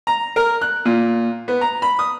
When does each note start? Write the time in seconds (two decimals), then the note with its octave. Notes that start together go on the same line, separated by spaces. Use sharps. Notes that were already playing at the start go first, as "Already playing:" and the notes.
0.07 A#5
0.36 A#4
0.61 F#6
0.85 A#2
1.48 B3
1.61 A#5
1.82 B5
1.99 D#6